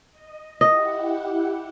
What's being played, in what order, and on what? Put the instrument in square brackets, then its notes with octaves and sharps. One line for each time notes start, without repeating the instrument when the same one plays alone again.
[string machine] D#5
[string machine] E4 G4 F#5 [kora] D#5